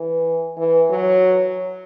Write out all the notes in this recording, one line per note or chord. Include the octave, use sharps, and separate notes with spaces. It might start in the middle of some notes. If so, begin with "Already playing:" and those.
Already playing: E3
E3
F#3